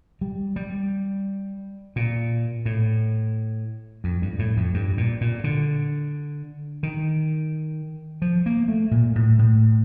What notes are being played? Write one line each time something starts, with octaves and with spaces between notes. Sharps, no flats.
G3
G3
A#2
A2
F2
G2
G2
A2
F2
G2
A#2
A#2
D3
D#3
F3
A#3
A3
A#2
A2
A2